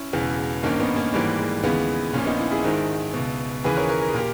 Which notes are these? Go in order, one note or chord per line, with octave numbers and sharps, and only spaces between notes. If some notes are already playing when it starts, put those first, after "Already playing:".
Already playing: C#4 E4
E1 E2 C#3 E3
G#1 G2 D#3 A#3 C#4
B3 D#4
A#3 C#4
G#1 G#2 E3 G3 A#3
G#3
D#2 C#3 E3 G#3 B3
A#1 A#2 A#3 C#4
B3 D#4
C#4 E4
E4 G#4
G#1 G#2 D#3
C#2 B2
D#2 C#3 E3 G#4 B4
A#4 C#5
A#4 C#5
A#4
G#4
A#2 G4 A#4